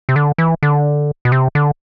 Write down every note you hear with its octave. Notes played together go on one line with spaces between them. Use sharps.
C3
D3
E3
D3
B2
C3
D3